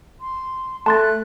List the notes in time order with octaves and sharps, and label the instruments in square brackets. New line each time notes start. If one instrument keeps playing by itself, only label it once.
[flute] C6
[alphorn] A3 [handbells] A5 C6 A6 [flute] F#6